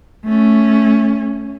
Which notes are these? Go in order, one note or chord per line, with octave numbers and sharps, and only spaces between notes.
A3 C#4